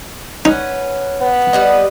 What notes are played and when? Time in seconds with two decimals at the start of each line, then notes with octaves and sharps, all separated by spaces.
0.45 C#4 D#4 B4 F#5
1.21 B3
1.53 G3 B4 D#5